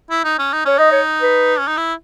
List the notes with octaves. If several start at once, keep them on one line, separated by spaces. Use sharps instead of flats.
E4
D#4
C#4
D#4
C#4 C#5
D#4 D#5
C#5
B4
C#4
D#4
E4